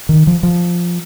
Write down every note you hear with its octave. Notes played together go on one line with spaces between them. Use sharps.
D#3
F3
F3